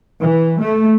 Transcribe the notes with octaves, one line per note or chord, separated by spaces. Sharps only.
E3
A3